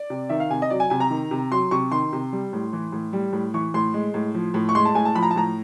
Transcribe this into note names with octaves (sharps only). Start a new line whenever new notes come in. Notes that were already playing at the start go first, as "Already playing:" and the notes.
Already playing: D5
C3
D#3 E5
F5
C3 G#5
D#5
F#3 D5
G#5
C3 G#5
A#5
D#3
C3
F#3 C6
C3 C#6
D#3 C6
C3
G3
A2
E3
A2
G3
A2
E3 C#6
A2 C6
G#3
A2
F3
A2
C#6
G#3 C6
A5
A2 G#5
A5
F3 B5
A#5
A5
A2 A#5